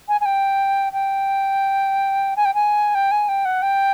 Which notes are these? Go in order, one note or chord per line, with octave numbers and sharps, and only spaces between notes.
G#5
G#5
G5
G5
G#5
G5
G#5
G5
G#5
G5
F#5
G5